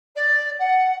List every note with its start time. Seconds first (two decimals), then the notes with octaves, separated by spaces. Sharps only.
0.15 D5
0.59 F#5